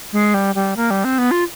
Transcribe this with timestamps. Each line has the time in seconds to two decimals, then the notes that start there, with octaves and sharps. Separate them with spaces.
0.13 G#3
0.34 G3
0.55 G3
0.77 A#3
0.91 G3
1.04 C4
1.18 B3
1.31 F4